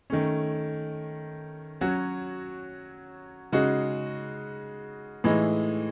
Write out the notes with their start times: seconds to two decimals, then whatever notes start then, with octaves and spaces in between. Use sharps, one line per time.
0.10 D#3 A3 C#4
1.81 F#3 C#4 F#4
3.52 C#3 G#3 D#4 F#4
5.24 A2 E3 G#3 D#4